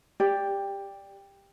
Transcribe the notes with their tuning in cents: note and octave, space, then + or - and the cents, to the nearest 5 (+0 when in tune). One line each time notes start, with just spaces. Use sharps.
G4 +15 D5 +0